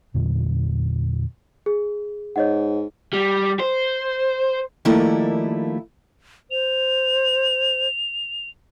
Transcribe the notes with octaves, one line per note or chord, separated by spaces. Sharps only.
E2 A#2 D3 F#3
G#4
G#2 C#5 D#5 F#5
G3
C5
D#3 F3 G3 A3 A#3 E4
C5 F7